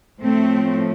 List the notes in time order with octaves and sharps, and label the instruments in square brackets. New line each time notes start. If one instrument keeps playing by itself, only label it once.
[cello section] A2 F3 A3 C4